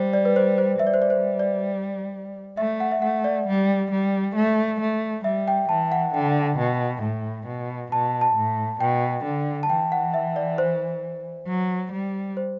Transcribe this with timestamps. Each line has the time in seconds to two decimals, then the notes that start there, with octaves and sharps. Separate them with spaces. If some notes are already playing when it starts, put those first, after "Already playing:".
Already playing: G3 C5
0.13 D5
0.25 B4
0.36 C5
0.58 C5
0.80 G3 E5
0.87 D5
0.94 C5
1.02 D5
1.10 C5
1.39 D5
2.57 A3 E5
2.80 F#5
2.91 E5
3.02 A3 F#5
3.24 D5
3.48 G3
3.91 G3
4.36 A3
4.80 A3
5.24 G3 E5
5.48 G5
5.69 E3 A5
5.92 F#5
6.14 D3 G5
6.58 B2
7.02 A2
7.47 B2
7.92 B2 A5
8.21 A5
8.36 A2
8.80 B2 G5
9.24 D3
9.63 A5
9.70 E3 G5
9.92 F#5
10.14 E5
10.36 D5
10.58 C5
11.47 F#3
11.92 G3
12.37 C5